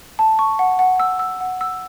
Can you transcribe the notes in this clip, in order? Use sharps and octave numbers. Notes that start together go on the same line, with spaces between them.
A5
C#6
F#5
F#5
E6
E6
F#5
E6